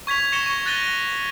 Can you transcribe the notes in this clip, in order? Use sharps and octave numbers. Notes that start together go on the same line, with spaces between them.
C#6 G#6 B6 F7
C#6 G#6 A#6 C#7 E7 G7
C#6
F#6 A6 A#6 D#7 G7